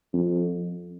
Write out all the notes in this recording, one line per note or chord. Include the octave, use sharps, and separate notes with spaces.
F2